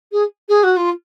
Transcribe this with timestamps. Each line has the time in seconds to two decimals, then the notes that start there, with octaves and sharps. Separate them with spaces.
0.12 G#4
0.48 G#4
0.63 F#4
0.76 F4